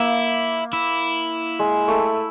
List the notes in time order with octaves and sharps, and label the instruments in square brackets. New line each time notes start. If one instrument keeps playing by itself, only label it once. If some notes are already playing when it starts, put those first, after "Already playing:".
Already playing: [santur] A#3 [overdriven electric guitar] E4
[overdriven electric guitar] E4
[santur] G#3
A3